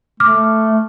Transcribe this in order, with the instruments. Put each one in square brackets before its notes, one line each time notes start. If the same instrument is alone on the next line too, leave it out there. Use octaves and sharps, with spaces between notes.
[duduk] A3 [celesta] D6 F6